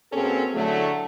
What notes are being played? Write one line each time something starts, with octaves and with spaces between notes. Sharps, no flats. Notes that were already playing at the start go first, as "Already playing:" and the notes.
B2 A#3 C4 C#4 G#4 A4
A2 D3 F#3 A3